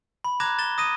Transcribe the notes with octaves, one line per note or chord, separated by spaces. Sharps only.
B5
A#5 D6 F#6 G#6 A#6 E7
A6 E7 G7
D#6 A#6 D#7